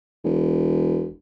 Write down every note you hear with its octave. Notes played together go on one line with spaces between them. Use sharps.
E1